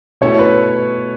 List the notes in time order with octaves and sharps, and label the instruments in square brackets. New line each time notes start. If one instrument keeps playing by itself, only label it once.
[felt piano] B2 A3 C#4 E4 A4 [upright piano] C#5
[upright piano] B4